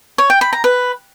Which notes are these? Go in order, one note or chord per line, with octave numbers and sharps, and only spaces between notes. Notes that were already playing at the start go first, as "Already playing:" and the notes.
C#5
G5
B5
A#5
B4